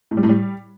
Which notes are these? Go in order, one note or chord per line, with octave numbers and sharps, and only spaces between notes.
A2
G3
A2
G3